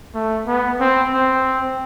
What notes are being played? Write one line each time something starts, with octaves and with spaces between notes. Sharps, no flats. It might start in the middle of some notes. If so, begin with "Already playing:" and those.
A3
B3
C4
C4